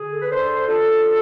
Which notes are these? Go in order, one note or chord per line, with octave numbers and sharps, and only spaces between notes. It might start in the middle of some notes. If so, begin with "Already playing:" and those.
Already playing: D3 G#4
A4
B4
D3 A4 C5
D3 F4 A4
G#3